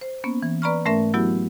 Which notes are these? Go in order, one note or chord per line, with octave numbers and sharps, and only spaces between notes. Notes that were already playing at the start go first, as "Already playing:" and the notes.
C5
A#3 B3 C#4
E3
B4 D5 A#5 B5 C#6 F6
G#2 A3 C#4 A#4 E5
F#3 B3 E4 F#4 G4